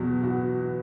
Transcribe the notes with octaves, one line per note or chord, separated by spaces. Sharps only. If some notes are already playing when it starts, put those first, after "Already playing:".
Already playing: E2 B2 F#3
F#4